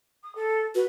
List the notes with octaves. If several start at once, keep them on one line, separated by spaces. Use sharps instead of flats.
D#6
A4
F#4 B4